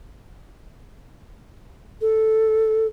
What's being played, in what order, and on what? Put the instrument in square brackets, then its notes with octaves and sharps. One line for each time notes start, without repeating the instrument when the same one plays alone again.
[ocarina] A4